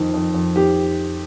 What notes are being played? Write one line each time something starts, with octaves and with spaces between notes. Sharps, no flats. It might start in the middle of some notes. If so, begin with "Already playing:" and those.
Already playing: F2 D#3
F2
F2
D#3 G4